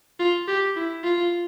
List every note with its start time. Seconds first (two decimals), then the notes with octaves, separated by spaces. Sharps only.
0.20 F4
0.48 G4
0.76 E4
1.04 F4